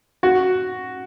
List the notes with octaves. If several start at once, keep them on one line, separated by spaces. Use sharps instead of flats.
F#4